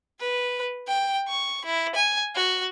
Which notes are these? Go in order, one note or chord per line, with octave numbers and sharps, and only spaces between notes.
B4
G5
C#6
E4
G#5
F#4